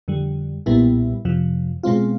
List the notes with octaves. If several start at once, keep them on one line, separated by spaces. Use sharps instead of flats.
F2 D3 G3
B1 A#2 G3 B3 E4
F2 C3 F3
B2 G#3 C4 F4